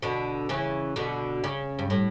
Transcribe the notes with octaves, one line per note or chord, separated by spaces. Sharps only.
B2 D3
C#3 E3
B2 D3
C#3
G2
A2